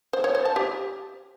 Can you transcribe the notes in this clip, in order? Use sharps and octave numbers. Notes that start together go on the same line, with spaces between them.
C5
C#5
C5
A5
G4